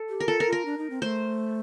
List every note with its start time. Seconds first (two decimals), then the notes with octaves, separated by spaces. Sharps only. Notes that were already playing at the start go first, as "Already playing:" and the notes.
Already playing: A4
0.09 G4
0.20 A#4
0.28 F4 A4
0.40 A#4
0.46 F4
0.52 A#4
0.65 D4
0.78 D#4
0.90 C4
1.02 A3 C5